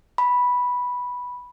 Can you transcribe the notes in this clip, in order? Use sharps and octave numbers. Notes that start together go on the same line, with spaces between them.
B5